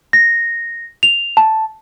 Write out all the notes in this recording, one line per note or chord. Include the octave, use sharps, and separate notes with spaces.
A#6
F7
A5